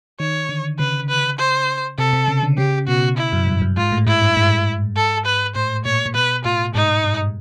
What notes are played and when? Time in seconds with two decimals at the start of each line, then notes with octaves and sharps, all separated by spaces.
0.20 D#3 C#5
0.49 D3
0.79 C#3 B4
1.09 B4
1.39 C5
1.98 C3 A4
2.13 C3
2.28 C#3
2.43 D3
2.57 C#3 G4
2.88 B2 F#4
3.18 E4
3.32 F#2
3.47 G2
3.62 F#2
3.76 G#2 F4
3.92 A2
4.07 G#2 E4
4.22 G2
4.37 G#2
4.96 A4
5.25 B4
5.56 A2 C5
5.85 A#2 C#5
6.06 A#2
6.15 B2 B4
6.45 A2 F4
6.75 G#2 D#4
7.04 G2